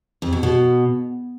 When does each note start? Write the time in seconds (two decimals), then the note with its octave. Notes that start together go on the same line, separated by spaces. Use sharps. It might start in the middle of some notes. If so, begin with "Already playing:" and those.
0.22 F2
0.33 B2
0.43 B2